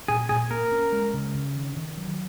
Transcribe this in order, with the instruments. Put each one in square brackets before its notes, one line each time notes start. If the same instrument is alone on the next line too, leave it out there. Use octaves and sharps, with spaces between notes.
[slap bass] A#2 [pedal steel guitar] G#4
[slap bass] A#2 [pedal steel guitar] G#4
[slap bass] A#3 [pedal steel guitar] A#4
[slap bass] C#4
G#3
C#3
C#3
D#3
D#3
F#3